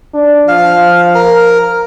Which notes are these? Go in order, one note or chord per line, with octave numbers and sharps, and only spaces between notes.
D4
F3 F5
A#4